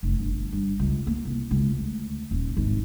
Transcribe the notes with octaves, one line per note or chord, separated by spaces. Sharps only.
F1
G1
G2
C#2
A#3
C2
C#2
D2
D#1
G#1